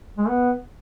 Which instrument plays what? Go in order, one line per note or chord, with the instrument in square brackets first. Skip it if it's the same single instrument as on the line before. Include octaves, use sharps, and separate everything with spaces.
[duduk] G#3
B3